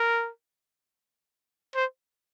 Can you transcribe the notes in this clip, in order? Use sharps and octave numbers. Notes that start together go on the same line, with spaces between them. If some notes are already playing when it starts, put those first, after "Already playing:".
Already playing: A#4
C5